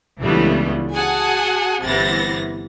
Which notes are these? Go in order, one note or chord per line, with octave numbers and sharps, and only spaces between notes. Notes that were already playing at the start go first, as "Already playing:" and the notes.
C#2 D3 E3 G3 A3 B3
F#4 G#4 F#5 G#5 A5
G1 C3 E3 B3 A6 A#6